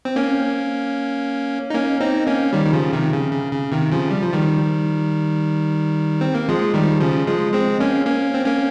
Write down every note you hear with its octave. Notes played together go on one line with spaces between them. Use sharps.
C4
A#3 C#4
D#4
A#3 C#4
C4 D#4
A#3 C#4
D#3 G3
D#3
C#3 F3
C3 D#3
C#3
C#3
C#3
C3 D#3
C#3 F3
G3
F3
D#3 G3
C4
A#3
F3 G#3
D#3 G3
C#3 F3
F3 G#3
G#3 C4
A#3 C#4
A#3 C#4
C4
A#3 C#4